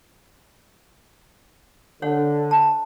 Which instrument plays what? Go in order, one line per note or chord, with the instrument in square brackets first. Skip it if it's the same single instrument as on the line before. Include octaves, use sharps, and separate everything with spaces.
[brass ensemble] D3 [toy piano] C#5 F#5
[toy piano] A5